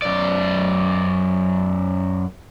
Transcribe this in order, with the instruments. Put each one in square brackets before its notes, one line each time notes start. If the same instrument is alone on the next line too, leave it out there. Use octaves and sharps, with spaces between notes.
[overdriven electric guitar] F#2 D5